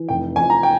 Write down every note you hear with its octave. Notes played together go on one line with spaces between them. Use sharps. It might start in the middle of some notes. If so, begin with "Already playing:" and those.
Already playing: E3
F1 G5
F2 G#5
A#5
G5